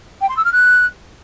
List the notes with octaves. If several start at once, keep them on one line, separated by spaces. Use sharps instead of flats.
G5
C6
E6
F6
F#6